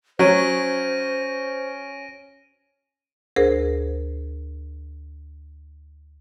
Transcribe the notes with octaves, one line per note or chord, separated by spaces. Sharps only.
F#3 C#4 C5 A#6 D7 D#7
D2 G#4 A#4 C5